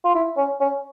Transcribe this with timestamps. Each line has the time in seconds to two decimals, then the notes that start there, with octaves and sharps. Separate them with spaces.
0.04 F4
0.15 E4
0.37 C#4
0.60 C#4